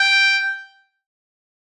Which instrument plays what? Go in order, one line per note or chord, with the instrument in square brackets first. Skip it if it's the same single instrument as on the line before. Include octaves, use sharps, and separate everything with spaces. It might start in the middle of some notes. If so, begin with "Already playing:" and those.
Already playing: [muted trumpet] G5